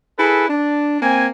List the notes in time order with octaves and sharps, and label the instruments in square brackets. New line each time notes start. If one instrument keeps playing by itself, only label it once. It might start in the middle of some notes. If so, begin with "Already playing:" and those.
[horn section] E4 G#4 A4 B4
D4
A#3 C4 G#5